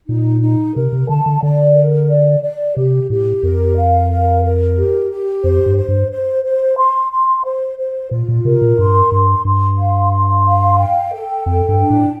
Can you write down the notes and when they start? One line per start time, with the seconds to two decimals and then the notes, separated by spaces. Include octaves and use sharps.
0.09 A#2 D#4
0.42 D#4
0.75 C3 A#4
0.93 C3
1.09 D3 A5
1.26 D3
1.42 D3 D5
1.75 A#4
2.10 D5
2.43 D5
2.77 C3 G4
3.10 A2 G4
3.43 F2 A#4
3.76 F5
4.11 A#4
4.44 A#4
4.77 G4
5.10 G4
5.44 F2 C5
5.66 G2
5.77 C5
5.88 G2
6.11 C5
6.44 C5
6.77 C6
7.12 C6
7.45 C5
7.78 C5
8.11 A#2 F4
8.28 A#2
8.45 C3 A#4
8.62 A#2
8.79 G2 C6
9.12 G2 C6
9.45 G2 C6
9.79 F5
10.12 C6
10.46 F5
10.78 G5
11.13 A4
11.46 F2 G5
11.69 G2
11.80 D4
11.90 A2